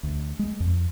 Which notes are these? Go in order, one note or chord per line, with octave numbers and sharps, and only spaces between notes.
D2
G#3
F2